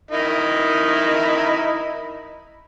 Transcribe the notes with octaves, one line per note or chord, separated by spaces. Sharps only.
D#4 E4 A#4